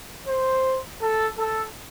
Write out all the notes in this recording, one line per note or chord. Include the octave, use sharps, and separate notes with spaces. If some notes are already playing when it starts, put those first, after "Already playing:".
C5
A4
A4